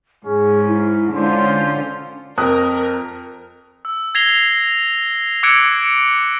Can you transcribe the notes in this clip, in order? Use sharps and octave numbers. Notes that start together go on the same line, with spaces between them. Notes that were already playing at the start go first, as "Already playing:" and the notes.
G#2 C#4 G#4
E4
D3 G#3 C#4 F4 C5
F2 A#4 D#6 F#6
E6
G#6 A#6 C7 F7 G7
D6 E6 F#6 G#6 C#7 D7